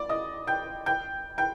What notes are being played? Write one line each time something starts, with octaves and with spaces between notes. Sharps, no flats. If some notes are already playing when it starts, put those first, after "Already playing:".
Already playing: D5 D6
D#5 D#6
G5 G6
G5 G6
G5 G6